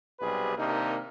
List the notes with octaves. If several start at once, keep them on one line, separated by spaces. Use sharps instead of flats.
B1 C3 G3 G4 G#4 B4
C3 D#3 A#3 D4 D#4